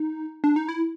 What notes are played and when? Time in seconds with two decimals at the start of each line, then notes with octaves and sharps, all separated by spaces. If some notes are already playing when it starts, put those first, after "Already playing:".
Already playing: D#4
0.44 D4
0.56 D#4
0.69 E4